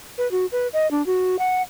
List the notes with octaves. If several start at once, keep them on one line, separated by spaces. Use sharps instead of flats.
B4
F#4
B4
D#5
D4
F#4
F#5